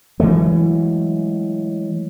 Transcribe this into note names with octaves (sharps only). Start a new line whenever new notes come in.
E3 F#3 G#3 A3